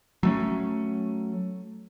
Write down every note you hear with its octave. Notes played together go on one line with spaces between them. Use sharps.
F#3 A3 C#4